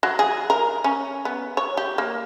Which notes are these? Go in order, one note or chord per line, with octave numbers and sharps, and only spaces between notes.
F#3
G#4
A#4
C#4
B3
C#5
G4
A#3